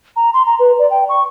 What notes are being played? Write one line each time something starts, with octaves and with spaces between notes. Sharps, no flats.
A#5
C6
A#5
B4
D5
G5
C#6